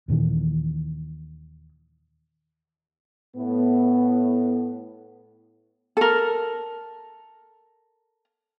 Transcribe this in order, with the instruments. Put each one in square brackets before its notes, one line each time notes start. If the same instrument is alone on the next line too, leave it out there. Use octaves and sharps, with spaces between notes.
[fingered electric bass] D#1 A#2 D#3 E3
[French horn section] A2 B3
[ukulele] A4 A#4